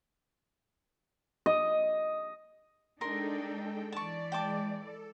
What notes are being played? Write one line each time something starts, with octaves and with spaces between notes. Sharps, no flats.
D#5
G#3 D4 D#4 A4 A#4 G5 C6
E3 D5 A5 C#6
G#3 G5 A5 D6
A4